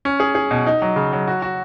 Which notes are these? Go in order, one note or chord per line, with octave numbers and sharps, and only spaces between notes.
C#4
G#4
G#4
B2
D#4
F#3
C#3
F#3
F#4
F#4